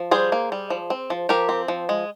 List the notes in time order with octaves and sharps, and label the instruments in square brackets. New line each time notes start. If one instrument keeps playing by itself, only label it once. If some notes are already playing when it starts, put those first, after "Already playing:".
Already playing: [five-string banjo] F3
G3 G#4 C5
A#3
G3
F3
C4
F3
F3 G4 A#4
C4
F3
G#3